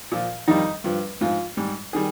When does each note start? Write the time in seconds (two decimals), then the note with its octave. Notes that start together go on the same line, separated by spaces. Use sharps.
0.12 A#2 F3
0.48 F2 D#3 G3 D#4
0.84 G2 F3
1.21 G#2 F3 F4
1.57 G#2 G3
1.93 D#3 G3 G#4